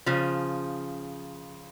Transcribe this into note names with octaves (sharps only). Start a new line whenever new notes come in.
C#3 F3